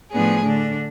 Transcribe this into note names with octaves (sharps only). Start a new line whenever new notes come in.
A2 F3 B3 D4 G#4
D3 A3 D4